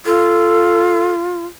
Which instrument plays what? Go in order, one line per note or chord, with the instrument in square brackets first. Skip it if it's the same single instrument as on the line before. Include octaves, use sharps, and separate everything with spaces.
[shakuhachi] F4 [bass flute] A4